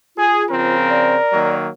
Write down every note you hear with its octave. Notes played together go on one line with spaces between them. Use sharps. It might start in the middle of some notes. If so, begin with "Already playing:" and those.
F4 G#4
C#3 F3 C4 A#4
D5
D#3 F#3 A#3